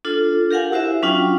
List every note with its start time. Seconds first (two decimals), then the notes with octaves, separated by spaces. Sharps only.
0.05 D4 F4 A4
0.51 G4 A#4 F5 F#5 G#5
0.72 E4 F#4 C5 E5
1.02 F#3 C#4 D4 F4 F5 G5